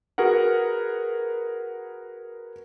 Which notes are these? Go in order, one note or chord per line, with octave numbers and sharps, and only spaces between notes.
F#4 G#4 A#4 B4 F#5